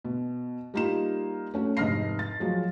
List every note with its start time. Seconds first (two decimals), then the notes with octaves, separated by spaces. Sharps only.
0.05 B2
0.74 G3 A#3 D#4 F4 E7
1.54 A3 C#4 F#4
1.77 F1 G#2 F6 A#6 C7
2.19 A6
2.40 F3 F#3 G#3 F#4